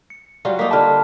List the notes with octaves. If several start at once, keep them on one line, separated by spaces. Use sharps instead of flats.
C#7
F#3 G3 F4
A#3 D#4 F4 B6
D3 G3 A5 B5 F6